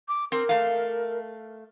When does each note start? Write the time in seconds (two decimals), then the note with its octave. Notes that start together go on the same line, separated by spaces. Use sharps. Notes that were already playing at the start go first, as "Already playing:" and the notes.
0.08 D6
0.32 C4 A#4
0.49 A3 F5